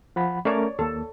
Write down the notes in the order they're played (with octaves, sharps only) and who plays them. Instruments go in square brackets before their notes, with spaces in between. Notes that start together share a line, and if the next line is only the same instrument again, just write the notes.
[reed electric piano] F3 F#5 B5
[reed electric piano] A3 C#4 A#4 [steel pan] C#5 D5
[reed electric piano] D#2 A#3 [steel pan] A4